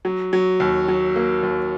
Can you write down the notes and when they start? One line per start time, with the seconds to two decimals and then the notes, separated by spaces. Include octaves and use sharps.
0.05 F#3
0.33 F#3
0.60 D#2
0.88 F#3
1.16 A#3
1.43 D#2